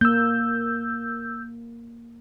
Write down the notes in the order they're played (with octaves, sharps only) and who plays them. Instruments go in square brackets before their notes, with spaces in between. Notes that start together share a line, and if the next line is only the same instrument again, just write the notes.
[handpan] A#3 [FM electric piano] E6 G6